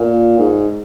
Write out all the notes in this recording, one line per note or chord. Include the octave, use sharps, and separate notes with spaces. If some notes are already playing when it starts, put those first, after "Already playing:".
Already playing: A#2
G#2